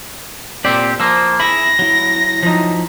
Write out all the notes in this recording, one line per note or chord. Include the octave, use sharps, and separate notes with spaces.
A#2 C4 G4 D5
F3 A#3 C5 E6
E4 G#4 E5 B5 A#6
F#3 E4
F3 D#4